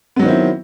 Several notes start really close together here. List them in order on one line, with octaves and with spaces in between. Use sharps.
B3 F#3 D#3 C4 E4